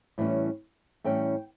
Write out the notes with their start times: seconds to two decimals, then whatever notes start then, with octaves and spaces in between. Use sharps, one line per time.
0.18 A2 E3 G3 C#4
1.04 A2 E3 G3 C#4 G5